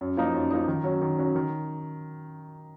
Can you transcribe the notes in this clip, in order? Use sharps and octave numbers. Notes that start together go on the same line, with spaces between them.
F#2
F3 A#3 D#4
F#2
F3 A#3 D#4
D#3
F#3 C#4
D#3
F#3 C#4
D#3